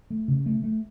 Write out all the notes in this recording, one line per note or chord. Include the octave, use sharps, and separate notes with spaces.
A3
C#3
A3
A3